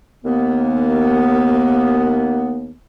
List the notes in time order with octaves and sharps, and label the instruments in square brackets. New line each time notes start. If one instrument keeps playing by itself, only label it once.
[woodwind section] D#2 A#3 B3